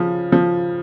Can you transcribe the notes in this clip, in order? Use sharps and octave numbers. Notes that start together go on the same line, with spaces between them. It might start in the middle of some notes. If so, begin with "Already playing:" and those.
Already playing: C#3 F3
F3